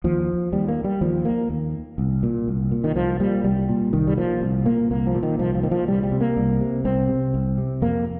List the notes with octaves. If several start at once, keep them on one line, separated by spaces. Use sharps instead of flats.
D#2 F3
D#2 G3
A#3
G3
D#2 F3
A#3
D#2
C2
A#2
C2
A#2
D#3
C2 F3
A#2 G3
C2 G3
A#2
C2 D#3
G3
A#2 F3
C2
A#2 A#3
C2 A#3
F3
A#2
D#3
C2 F3
F3
A#2 D#3
F3
C2 G3
G3
C3
A#3
C2
C3
C2 C4
C3
C2
C3
F2 A#3